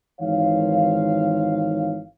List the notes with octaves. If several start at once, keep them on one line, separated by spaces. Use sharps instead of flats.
G#1 D#3 E3 G#3 C#5 F5